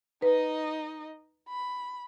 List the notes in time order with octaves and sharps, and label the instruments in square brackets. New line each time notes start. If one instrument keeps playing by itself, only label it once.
[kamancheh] D#4 D#5 [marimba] B4
[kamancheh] B5